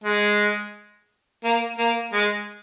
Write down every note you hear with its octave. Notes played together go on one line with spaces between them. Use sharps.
G#3
A#3
A#3
G#3